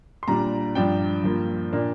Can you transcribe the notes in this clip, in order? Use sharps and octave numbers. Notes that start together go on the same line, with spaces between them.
C6
A#2 G3 D4 A#5
G2 F3 D4 G5
G2 F3 A#3
A#2 A#3 D4